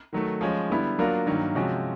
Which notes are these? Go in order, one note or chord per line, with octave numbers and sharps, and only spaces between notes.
D#3 F#3 A3
F3 G#3 C#4
D3 G3 B3 E4
F#3 A#3 D4 F4 A#4
G2 D#3 F#3 A#3
C3 F3 G#3 C#4 F#4